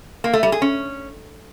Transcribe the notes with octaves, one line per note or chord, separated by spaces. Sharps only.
A#3
A3
G3
G#4
C#4